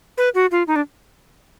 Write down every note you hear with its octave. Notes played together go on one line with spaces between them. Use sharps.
B4
F#4
F4
D#4
D4